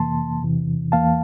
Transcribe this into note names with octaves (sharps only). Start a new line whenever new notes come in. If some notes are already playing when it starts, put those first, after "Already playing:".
Already playing: F2 C3 E3 A#3 A5 C6
E2 C3 E3
E2 E3 A#3 F5 A5